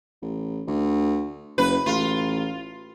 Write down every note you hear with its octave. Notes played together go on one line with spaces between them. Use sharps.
A1
D2
F#1 B4
A1 F4